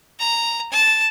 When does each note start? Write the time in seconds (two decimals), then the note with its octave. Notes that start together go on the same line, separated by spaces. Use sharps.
0.20 A#5
0.72 A5